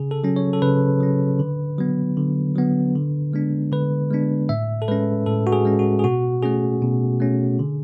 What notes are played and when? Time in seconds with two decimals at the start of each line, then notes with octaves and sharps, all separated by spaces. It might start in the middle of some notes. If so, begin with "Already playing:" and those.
Already playing: C#3 G#4
0.11 A4
0.24 F#3 C#4
0.36 C#5
0.53 A4
0.62 C#3 B4
1.01 F#3 C#4
1.39 D3
1.78 F#3 B3
2.17 D3
2.55 F#3 B3
2.95 D3
3.33 G#3 B3 D4
3.72 D3 B4
4.11 G#3 B3 D4
4.49 A2 E5
4.82 A4
4.88 G#3 C#4 B4
5.26 A2 A4
5.47 F#4
5.52 G#4
5.65 G#3 C#4
5.79 F#4
5.99 G#4
6.04 B2 F#4
6.42 A3 C#4 G#4
6.82 B2
7.20 A3 C#4
7.59 D3